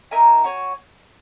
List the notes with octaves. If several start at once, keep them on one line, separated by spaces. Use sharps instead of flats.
D#4 A#4 E5 G#5
F#4 C#5 G#5